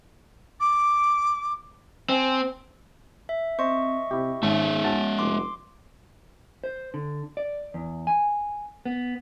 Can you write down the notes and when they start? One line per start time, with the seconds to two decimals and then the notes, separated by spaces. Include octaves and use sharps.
0.60 D6
2.09 C4 G#5
3.29 E5
3.59 C4 C5 D#5 E5 C#6
4.11 C3 E4 G4
4.43 G#1 G#2 G#3 C#4 E5
4.84 C#4 F#4 A5 A6
5.18 F1 C6 D6
6.64 C5
6.94 D3
7.37 D5
7.74 E2
8.07 G#5
8.86 B3